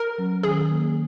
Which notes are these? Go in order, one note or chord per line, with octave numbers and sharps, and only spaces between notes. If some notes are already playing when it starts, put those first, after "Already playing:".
Already playing: A#4
F#3 C#4
D#3 G#4
F#3 A#3